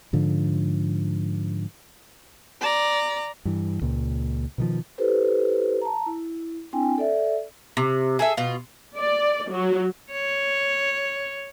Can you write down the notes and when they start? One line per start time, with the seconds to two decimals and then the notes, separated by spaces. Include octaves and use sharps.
0.13 G#2 D3 F3
2.61 D5 A#5
3.45 G2 E3
3.82 C#2 A#2
4.58 B2 D#3 F3
4.98 E4 G4 A4 B4 C5
5.82 A5 A#5
6.06 E4
6.73 C4 D4 E4 G5 G#5
6.98 A4 D5 E5
7.77 C3
8.19 G#4 A4 E5
8.37 B2 F4
8.97 D5
9.51 F#3
10.12 C#5